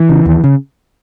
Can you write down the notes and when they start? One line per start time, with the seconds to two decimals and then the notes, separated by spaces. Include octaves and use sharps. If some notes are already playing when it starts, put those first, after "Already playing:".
Already playing: E3
0.09 C#3
0.25 D#2
0.44 C#3